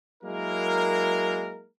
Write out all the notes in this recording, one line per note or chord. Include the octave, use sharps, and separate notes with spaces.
F#3 G#3 A#3 E4 A#4